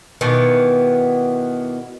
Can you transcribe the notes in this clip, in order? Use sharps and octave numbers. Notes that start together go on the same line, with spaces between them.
B2 D#3 E3 B3